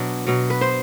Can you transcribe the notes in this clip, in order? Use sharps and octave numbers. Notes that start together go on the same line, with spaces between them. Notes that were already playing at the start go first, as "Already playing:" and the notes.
Already playing: B2 F#3 D4 D5
B2 F#3
B4
C5